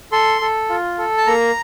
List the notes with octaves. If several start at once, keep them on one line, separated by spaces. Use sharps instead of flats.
A4 C6
A4
F4
A4
A5
A#3 A#5